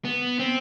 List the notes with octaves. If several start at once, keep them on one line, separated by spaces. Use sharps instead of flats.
B3
C4